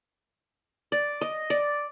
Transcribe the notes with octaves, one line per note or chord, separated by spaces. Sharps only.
D5
D#5
D5